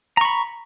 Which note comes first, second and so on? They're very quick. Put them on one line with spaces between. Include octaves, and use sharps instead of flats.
A#5 C#6 B5